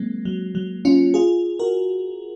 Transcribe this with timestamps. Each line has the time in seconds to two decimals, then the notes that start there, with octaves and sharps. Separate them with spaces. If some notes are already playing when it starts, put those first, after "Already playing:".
Already playing: F#3 G#3 A#3 C4
0.25 F#3
0.55 F#3
0.85 C#4 F4
1.14 F4 G#4
1.59 F#4 A#4